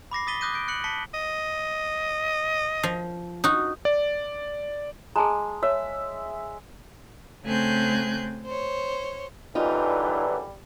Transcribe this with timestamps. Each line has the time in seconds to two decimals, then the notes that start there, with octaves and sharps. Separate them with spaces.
0.11 B5 D6 A#6 C7
0.27 D#6 A6 B6 D#7 G7
0.41 D6 D#6 F#6 G6 A#6 D#7
0.54 G6 D7
0.68 F#6 C#7 F#7
0.84 A5 B6 C#7 G7
1.14 D#5
2.83 F3
3.44 D#4 F#4
3.85 D5
5.16 G#3 G#4 A5 A#5
5.63 C#5 E5
7.44 C#3 A3 C4 G#5 F#6 G6
8.44 C5 C#5
9.55 F#2 D3 E3 G3 D#4 F4 B4